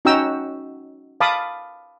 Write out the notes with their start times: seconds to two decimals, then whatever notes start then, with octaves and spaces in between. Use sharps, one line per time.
0.05 C#4 D#4 F#4 G5 A#5 E6
1.20 F5 A5 B5 D6 D#6